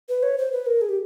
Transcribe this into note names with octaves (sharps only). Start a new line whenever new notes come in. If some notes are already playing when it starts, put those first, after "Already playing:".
B4
C#5
C5
B4
A#4
G#4
G4